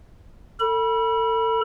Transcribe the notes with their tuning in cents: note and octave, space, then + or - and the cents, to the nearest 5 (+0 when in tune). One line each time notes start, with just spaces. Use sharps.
A4 +35 B5 -25